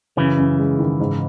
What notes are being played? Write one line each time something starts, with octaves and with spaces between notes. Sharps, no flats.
F#2 C#3 E3
F#2
G#3
D#3
G#2